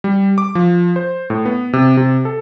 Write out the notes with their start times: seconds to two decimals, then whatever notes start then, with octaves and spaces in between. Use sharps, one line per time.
0.04 G3
0.38 D6
0.55 F3
0.96 C5
1.30 A2
1.45 B3
1.73 C3
1.97 C3
2.25 A4